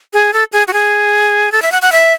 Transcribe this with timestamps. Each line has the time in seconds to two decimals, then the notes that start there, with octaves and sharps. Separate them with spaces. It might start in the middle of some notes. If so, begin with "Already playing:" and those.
0.13 G#4
0.33 A4
0.53 G#4
0.68 F#4
0.73 G#4
1.52 A4
1.62 E5
1.72 F#5
1.82 F#5
1.92 E5